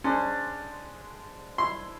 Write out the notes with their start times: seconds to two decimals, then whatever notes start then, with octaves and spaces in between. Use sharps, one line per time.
0.04 G#3 C#4 D4 C5
1.58 E4 C6